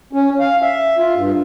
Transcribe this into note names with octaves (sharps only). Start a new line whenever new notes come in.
C#4
F5
E5
F4
G2